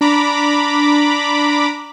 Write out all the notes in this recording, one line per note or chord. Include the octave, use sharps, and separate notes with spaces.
D4 A#5 B5 D6